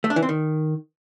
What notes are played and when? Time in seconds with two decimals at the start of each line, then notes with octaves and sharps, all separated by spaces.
0.04 A3
0.10 D4
0.16 E3
0.23 C4
0.29 D#3